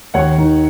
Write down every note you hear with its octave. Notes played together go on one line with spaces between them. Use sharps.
D#2 C#5 F#5
D#3